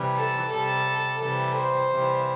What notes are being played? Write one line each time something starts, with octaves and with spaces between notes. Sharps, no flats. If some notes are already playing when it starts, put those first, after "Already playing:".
Already playing: C3 E3 G3
A4
C3 G3 A4
C3 E3 G3 A4
C5
C3 E3 G3